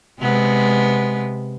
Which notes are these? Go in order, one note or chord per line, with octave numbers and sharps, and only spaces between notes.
C3 G#3 B3